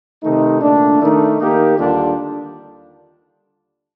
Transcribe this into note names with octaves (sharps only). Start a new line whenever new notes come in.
C3 D#3 A3 D#4
A#2 A3 D4
D#3 A3 D#4 A#4
D#3 A#3 D#4 G4 A#4
D#2 D3 G3 D4 F4